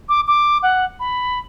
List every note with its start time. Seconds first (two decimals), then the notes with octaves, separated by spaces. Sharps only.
0.09 D6
0.27 D6
0.63 F#5
1.00 B5